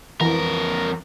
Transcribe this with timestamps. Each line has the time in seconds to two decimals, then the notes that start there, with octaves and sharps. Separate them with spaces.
0.21 F2 E3 A#4